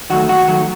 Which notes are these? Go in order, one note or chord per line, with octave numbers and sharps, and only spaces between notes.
D#3 F#3 A3 F#4
D#2 F#4
D#3 F#3 A3